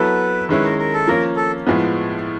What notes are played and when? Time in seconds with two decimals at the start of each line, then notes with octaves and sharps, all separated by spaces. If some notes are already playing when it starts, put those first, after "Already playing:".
Already playing: F#3 B3 E4 A4 B4
0.49 D#3 G#3 C#4 E4 B4
0.64 A#4
0.78 A#4
0.93 A4
1.07 F3 A#3 C#4 A#4
1.36 A4
1.67 A2 F3 G#3 B3